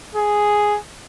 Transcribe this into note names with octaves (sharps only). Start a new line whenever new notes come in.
G#4